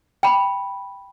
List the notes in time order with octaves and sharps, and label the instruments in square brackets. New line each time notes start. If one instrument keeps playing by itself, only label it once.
[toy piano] G5 B5